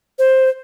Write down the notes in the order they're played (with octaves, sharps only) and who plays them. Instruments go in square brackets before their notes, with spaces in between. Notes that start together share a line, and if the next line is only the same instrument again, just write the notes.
[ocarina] C5